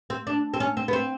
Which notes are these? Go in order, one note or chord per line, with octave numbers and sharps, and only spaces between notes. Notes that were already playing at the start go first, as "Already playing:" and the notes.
C4
D4
C4
C#4
C4
B3
C4